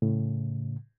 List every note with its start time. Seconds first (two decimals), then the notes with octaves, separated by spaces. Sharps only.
0.02 A2 C#3